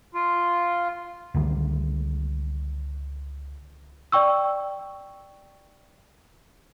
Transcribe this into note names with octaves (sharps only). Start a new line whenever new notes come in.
F4
C#2 D3 D#3 G3
D5 G5 C#6 E6